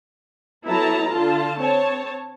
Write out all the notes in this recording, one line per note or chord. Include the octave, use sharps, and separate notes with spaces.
F#3 B3 E4 A4 A5 A#5
D3 F4 A5
C4 C#5 A5